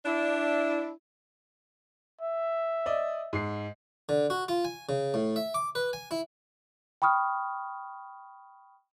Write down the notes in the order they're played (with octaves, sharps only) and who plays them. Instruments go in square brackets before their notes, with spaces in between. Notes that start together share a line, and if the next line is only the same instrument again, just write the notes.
[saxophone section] D4 E4
[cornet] E5
[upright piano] D5 D#5
G#2 C7
[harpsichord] D3
F#4
F4
G#5
C#3
A2
E5
D6
B4
G#5
E4
[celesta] G5 B5 C#6 D#6 F6